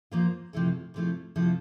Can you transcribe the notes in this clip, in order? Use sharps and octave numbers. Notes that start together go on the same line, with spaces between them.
F3 A#3 F4 C5
C3 F3 A3 E4 A4
C3 F3 A3 E4 A4
C3 F3 A3 E4 A4